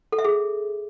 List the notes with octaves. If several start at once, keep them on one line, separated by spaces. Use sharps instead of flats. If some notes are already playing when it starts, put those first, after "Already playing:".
A4
E5
G#4